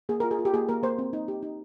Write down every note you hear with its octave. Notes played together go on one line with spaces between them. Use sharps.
A#3 G#4
F4 A#4
G#4
F4
G4
A#3 G#4
A#3 A#4
A#3 C5
C4
D#4
G4
D#4